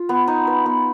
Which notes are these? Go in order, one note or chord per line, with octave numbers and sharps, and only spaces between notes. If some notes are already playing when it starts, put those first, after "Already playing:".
Already playing: F4
B3
D#4
B4
B3